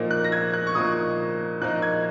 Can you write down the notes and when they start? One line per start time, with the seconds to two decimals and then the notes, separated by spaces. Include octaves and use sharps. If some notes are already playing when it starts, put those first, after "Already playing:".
Already playing: A#2 F3 A#3 D#4
0.11 F#6
0.24 A#6
0.32 G#6
0.53 F#6
0.67 C#6
0.75 A#2 F3 A#3 D#4 D#6
1.62 A#2 F3 A#3 D#4 F#6
1.82 G#6